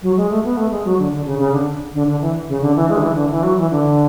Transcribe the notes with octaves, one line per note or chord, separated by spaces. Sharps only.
F#3
G#3
A3
B3
A3
G#3
F#3
D3
D3
C#3
C#3
D3
D3
D3
E3
C#3
D3
E3
G#3
D3
E3
D3
E3
F#3
E3
D3